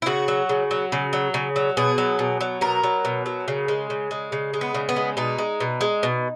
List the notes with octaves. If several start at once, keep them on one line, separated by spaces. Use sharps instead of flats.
E4
C#3 F#4
F#3
C#3
F#3
C#3
F#3
C#3
F#3
B2 G#4
F#3
B2
F#3
B2 A#4
F#3
B2
F#3
C#3
G#3
C#3
G#3
C#3
G#3
B3
C#3
B3
G#3
B2 D#4
G#3
B2
G#3
B2